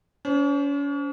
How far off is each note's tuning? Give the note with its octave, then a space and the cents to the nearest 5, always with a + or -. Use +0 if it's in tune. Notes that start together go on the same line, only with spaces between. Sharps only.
C#4 +40 C5 +0